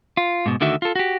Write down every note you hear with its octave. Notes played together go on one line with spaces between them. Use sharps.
F4
G#2 B2
D2 D3 D#3 F#4 E5
F4 A4
F#4 G4